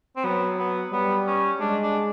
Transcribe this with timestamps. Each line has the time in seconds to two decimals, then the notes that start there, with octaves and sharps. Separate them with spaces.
0.17 C4
0.24 F#3 B3
0.59 B3
0.92 G3 B3
1.27 C#4
1.60 G#3 D4
1.82 D4